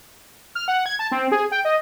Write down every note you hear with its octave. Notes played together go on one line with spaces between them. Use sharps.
F6
F#5
G#6
A5
C4
G#4
G5
D#5